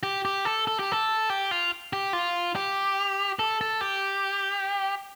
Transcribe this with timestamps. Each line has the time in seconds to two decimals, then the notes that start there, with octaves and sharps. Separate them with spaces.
0.03 G4
0.25 G4
0.45 A4
0.67 A4
0.79 G4
0.92 A4
1.30 G4
1.51 F4
1.93 G4
2.13 F4
2.55 G4
3.39 A4
3.61 A4
3.81 G4